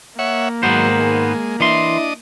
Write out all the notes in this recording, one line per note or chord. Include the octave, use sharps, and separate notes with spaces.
A#3 C#5 E5 F#5
G#2 D#3 F#3 B3 C5
G#3
E3 D4 E4 D#5 C6